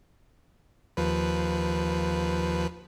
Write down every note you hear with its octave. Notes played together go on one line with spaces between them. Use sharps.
D#2 F3 B4